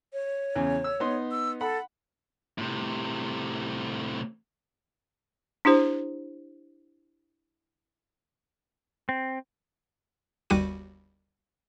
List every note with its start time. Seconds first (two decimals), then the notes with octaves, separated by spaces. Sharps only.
0.13 C#5
0.56 E2 C#3
0.84 E6
1.00 B3 D#4 C6
1.31 E6
1.61 A4 F#5 B5
2.58 A2 C3
5.65 D4 E4 G4 C5
9.09 C4
10.50 G1 D#2 G3 F#4 D6 D#7